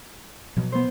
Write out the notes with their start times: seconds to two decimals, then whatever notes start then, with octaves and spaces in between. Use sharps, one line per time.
0.57 B2 F3 F#3
0.72 B3 C5